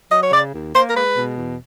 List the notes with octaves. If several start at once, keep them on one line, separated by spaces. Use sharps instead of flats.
F#3 D#5
C#5
C#3 D5
D#2
A#3 C5
A#4
G#3 B4
B2
E2